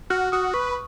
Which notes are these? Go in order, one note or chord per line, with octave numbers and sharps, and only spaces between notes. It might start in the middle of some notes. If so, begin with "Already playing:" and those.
F#4 F6
F#4 D#6
B4 C#6